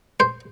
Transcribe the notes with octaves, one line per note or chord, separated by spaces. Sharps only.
C5